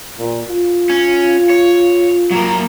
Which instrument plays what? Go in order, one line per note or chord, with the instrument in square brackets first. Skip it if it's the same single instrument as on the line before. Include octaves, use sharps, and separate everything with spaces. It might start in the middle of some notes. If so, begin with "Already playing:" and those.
[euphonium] A#2
F4
[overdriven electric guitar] C#4
C#5
F#3 A#3